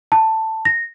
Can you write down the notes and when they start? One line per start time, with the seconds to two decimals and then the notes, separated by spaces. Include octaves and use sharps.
0.12 A5
0.65 A#6